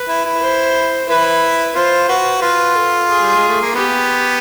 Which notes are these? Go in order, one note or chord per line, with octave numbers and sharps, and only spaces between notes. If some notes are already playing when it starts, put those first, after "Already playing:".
Already playing: B4
E4
E4
C5
E4 B4
F4 C5
F#4 B4
F4 B4
A4
G#4
G3
G#3
A3
A#3
B3 G4